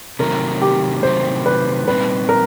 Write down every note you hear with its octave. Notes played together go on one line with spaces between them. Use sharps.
C3 D#3 F#3 A3 A#4
G4
C3 D#3 F#3 A3 C5
B4
A#2 G3 C4 D#4 B4
A#4